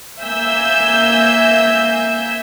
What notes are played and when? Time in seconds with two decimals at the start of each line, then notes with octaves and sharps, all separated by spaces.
0.22 A#3 E5 G#5 E6 G6